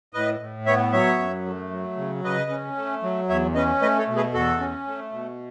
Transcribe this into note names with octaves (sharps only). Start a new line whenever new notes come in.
A2 B4 D#5
A2
B3 C#5 E5
F#3 C#5 E5
F#2
A3
F#3
C#3
C#3 B4 D#5
C#4
A3
F#3
E2 C#5 E5
C#4 B4 D#5
A3 B4 D#5
A4 C#5
B2
G#4 B4
E2 F#4 A4
C#4
A3
B2